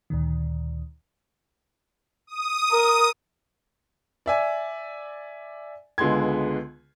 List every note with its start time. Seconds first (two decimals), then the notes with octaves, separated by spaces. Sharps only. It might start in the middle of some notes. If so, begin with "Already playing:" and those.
0.10 D2 A#2 D#3
2.27 D#6
2.72 A#4
4.26 D5 E5 G#5
5.98 C#2 D3 G#3 B3 C6 G#6